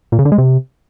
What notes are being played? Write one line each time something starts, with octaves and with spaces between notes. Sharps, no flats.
A#2
C#3
D3
G#3
C3